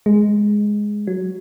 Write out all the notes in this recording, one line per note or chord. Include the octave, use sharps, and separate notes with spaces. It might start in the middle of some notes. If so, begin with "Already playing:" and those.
G#3
F#3